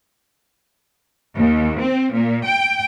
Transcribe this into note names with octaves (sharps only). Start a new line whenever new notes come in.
D#2
C4
A#2
G5